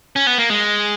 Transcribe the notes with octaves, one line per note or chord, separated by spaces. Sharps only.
C#4
B3
A#3
G#3